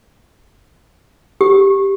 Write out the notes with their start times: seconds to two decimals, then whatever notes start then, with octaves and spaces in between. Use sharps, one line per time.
1.41 G4